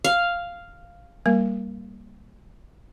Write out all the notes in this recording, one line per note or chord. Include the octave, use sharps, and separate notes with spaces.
F5
G3 A#3 A#4